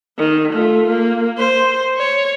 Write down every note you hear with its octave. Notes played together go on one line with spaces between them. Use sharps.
D#3
A3 F4
A#3
C5
C#5